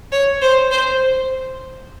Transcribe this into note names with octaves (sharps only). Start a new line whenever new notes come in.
C#5
C5
C5